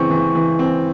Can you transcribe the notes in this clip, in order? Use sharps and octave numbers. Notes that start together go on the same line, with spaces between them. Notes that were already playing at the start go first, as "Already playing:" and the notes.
Already playing: C#3 E3 C4 C#6
E3
E3
C4